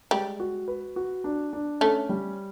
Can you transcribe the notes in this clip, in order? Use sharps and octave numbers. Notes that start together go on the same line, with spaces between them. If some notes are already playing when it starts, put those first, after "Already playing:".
G3 G#3
F#4
B4
F#4
D4
D4
A3 C#4
G3